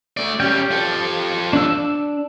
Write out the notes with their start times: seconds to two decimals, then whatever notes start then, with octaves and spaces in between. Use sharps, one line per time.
0.17 A3 D5
0.40 G3 C#4 G4 G5
0.71 F3 A4
1.53 D4 E6